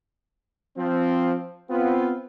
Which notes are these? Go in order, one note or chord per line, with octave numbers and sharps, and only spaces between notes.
F3 C4
B3 C4 F4